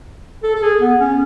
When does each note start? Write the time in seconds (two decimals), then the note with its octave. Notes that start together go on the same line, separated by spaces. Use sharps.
0.43 A4
0.55 A4
0.62 G#4
0.81 B3
1.00 C#4